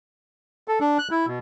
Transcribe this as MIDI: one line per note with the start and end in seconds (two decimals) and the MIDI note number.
0.68 0.79 69
0.81 0.98 62
0.99 1.08 90
1.11 1.26 64
1.27 1.39 47